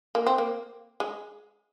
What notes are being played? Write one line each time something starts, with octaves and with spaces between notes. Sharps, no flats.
A#3
C4
A#3
G#3